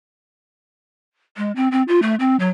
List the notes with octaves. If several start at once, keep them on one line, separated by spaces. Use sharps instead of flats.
G#3
C4
C4
F4
A3
C4
F#3